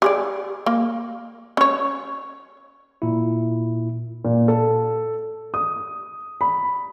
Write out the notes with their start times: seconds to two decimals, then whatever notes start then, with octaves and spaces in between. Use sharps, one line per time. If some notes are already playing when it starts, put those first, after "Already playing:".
0.02 G4 G#4 D5
0.66 A#3
1.57 C#4 C#5
3.02 A#2 E4
4.25 A#2
4.48 A4
5.54 D#6
6.41 B5